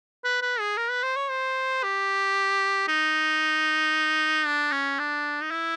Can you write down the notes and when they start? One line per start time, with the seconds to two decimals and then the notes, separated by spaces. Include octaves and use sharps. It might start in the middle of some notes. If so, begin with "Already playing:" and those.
0.24 B4
0.42 B4
0.60 G#4
0.77 A#4
0.90 B4
1.03 C5
1.16 C#5
1.29 C5
1.83 G4
2.88 D#4
4.46 D4
4.72 C#4
4.99 D4
5.41 D#4
5.51 E4